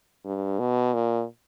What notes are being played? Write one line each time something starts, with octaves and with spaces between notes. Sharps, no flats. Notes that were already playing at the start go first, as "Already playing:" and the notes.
G2
B2
A#2